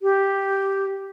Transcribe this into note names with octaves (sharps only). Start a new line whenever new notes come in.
G4